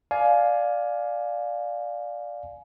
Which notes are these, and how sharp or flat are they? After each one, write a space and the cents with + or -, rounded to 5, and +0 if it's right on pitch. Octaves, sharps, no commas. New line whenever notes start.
D5 +0 F5 +10 G#5 +20